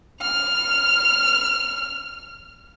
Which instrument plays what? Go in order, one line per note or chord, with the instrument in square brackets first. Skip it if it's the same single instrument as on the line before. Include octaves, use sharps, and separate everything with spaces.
[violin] F6 F7